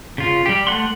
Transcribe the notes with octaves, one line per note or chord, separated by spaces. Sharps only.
C#3 F4
G3 G4
A3 F#5 C6